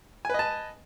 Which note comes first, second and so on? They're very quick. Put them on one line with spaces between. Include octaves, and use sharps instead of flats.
G#5 B4 D#5 A5